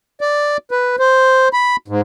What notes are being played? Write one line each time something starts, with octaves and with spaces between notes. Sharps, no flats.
D5
B4
C5
B5
G#2